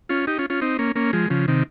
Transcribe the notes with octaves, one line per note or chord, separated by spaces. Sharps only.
C#4 F4
D#4 G4
C#4 F4
C#4 F4
C4 D#4
A#3 C#4
A#3 C#4
F3 G#3
C#3 F3
C3 D#3